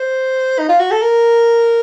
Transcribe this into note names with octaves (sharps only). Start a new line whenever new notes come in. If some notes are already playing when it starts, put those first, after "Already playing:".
Already playing: C5
D#4
F4
F#4
A4
A#4